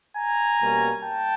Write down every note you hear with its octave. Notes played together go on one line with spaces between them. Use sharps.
G#5 A#5
B2 G3 A#3 C#4
G5 A5